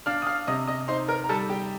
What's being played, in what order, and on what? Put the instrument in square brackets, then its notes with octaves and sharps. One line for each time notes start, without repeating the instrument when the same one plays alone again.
[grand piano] D4 [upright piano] F5 F6
[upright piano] D#6
F5 F6
[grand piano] C3 [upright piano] D#5 D#6
[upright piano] D#5 D#6
[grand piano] D#4 [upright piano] C5 C6
[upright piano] A#4 A#5
A#5
[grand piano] G3 [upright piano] A4 A5
[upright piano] G4 G5